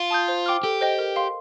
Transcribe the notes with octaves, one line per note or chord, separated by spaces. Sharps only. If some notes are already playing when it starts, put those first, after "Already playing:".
Already playing: F4
A5 D#6 G6
C5
G5 D6 F6
G4 A4
C5 D#5 G5
A#4
F5 C6